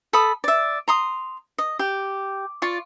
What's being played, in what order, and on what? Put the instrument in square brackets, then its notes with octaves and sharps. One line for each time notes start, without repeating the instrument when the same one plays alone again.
[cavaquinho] A4 B5 D#6
D5 E5
A#5 C6 D#6
D#5
G4
F4 D5 C#6